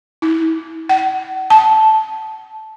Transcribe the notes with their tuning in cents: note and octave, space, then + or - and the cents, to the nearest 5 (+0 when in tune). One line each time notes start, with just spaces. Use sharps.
E4 -30
F#5 +40
A5 -10